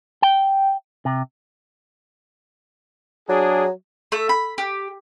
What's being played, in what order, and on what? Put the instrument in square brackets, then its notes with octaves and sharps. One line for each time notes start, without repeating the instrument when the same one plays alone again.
[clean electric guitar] G5
C3
[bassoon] F#3 [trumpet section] D4 G#4
[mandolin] A3 E5
B5
G4